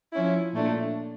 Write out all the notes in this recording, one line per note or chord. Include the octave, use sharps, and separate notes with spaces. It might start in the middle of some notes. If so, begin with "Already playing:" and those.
F3 C#4 E4
A#2 A3 D4